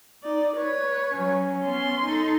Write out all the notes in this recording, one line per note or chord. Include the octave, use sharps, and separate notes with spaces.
D#4 D5
B4 C#5
F#3 C#4
B3 C6
D#4 A4